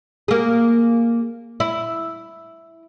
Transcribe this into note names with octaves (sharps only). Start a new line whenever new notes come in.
A#3 G#4
E4